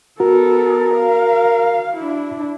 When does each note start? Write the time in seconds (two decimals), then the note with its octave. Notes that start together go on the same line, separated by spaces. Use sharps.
0.20 B3 F#4 A4 A#4
0.97 F5
1.97 D4 E4